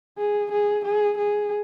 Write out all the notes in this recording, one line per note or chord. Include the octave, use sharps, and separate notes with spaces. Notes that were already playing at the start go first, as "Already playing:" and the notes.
G#4
G#4
G#4
G#4